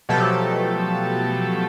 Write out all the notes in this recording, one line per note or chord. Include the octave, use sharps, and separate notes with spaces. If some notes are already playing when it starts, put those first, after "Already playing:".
B2 F3 F#3 A3 G4 A4